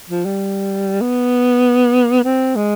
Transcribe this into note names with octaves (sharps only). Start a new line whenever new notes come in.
F3
G3
B3
C4
G#3